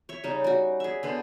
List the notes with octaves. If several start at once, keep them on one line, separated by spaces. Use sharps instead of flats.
C#5 E5
C#3 G3 C#4 D#4
G3 F#4
G#4 E5
D3 B3 C5